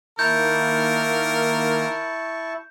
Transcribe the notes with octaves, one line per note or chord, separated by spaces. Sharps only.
D#3 A#3 E4 A#4 A5 C#6 G6